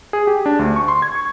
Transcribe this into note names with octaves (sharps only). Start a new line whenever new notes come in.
G#4
G4
D4
D2
C#6
C6
G#6
C#6